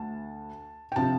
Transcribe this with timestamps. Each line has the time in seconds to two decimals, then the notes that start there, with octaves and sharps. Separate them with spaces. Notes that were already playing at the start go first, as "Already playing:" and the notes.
Already playing: D2 A5
0.92 G5
0.96 C3 F3 C4 A5